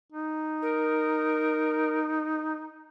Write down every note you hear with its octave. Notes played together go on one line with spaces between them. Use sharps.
D#4
A#4